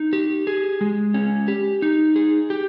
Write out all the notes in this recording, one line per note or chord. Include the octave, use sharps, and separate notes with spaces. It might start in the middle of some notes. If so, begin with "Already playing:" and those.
Already playing: D#4
G4
G#4
G#3
C#4
G4
D#4
G#4
G4